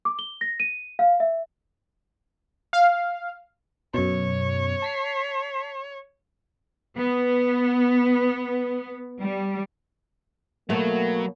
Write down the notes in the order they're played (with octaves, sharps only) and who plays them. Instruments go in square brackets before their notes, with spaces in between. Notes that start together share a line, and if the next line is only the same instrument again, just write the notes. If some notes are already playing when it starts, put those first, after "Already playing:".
[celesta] D6
G7
A#6
D#7
F5
E5
[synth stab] F5
[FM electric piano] F#2 B2 [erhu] C#5
[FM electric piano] A5 B6 C7
[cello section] B3
G3
[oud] B2 A3 [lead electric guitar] F#3 [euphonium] A#3